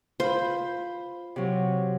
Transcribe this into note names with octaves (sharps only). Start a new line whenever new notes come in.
F4 C5 B5
C3 F#3